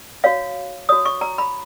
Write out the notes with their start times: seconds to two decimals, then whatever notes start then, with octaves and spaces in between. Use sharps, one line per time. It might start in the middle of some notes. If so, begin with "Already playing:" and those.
0.24 F#4 C#5 F5
0.89 F#4 C#5 D#6
1.05 C#6
1.21 A#5
1.38 B5